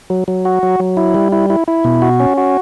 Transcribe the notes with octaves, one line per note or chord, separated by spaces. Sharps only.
F#3
F#3
F#4
F#3
F#3
E4
G3
E4
E4
E4
B2
F#4
C#4
F#4